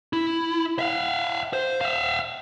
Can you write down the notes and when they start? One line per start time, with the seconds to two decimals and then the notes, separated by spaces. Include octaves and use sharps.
0.13 E4
0.79 E5 F5
1.53 C5
1.81 E5 F5